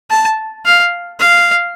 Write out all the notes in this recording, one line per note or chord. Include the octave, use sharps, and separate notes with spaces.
A5
F5
F5